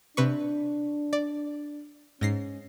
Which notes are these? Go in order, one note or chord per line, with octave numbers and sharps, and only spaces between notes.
C3 D4 B4 C#6
D5
G#2 C#4 A#6 C7